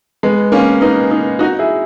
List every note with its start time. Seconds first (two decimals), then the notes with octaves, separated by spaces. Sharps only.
0.23 G#3 B3
0.52 A#3 C#4
0.81 B3 D#4
1.11 B3 D#4
1.39 D#4 F#4
1.59 E4 G#4